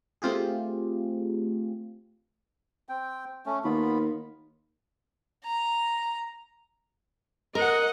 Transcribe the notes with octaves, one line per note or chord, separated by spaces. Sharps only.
A3 C4 F4 G4 G#4
C4 G5
A3 C#4
D#2 B3 F4 B5
A#5
A#4 D#5 F#5